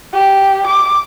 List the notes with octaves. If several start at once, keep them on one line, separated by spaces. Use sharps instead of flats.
G4
D6